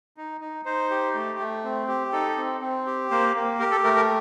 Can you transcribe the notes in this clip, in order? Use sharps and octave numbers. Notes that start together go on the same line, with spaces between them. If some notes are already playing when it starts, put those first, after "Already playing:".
D#4
D#4
D#4 C5
G4
A3
A3
C4
G4
D#4 A4
C4
C4
G4
A#3 C5
A#3
G4 A#4
A4
A3 A#4
A#4